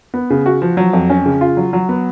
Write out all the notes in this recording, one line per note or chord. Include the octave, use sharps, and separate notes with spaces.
B3
C#3
F#4
F3
F#3
F2
C#4
C#3
F4
F#3
F#3
B3